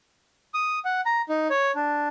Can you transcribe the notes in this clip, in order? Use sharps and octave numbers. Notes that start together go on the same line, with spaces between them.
D#6
F#5
A#5
D#4
C#5
D4